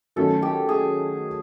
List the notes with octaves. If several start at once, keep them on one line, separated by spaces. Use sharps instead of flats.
D#3 F#3 A3 C#4 A4
G4
G#4